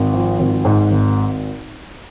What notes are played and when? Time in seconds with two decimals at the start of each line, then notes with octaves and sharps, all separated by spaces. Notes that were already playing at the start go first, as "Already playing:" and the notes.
Already playing: G#1
0.13 F3
0.39 G#1
0.65 G#2
0.91 G#1